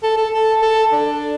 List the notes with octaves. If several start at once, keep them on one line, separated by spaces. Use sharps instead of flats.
A4
A4
A4
A4
D4